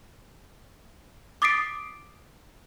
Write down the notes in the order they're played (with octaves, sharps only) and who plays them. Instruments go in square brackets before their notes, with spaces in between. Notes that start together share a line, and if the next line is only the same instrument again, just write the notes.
[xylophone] D6 D#6 A6 B6 C7 D7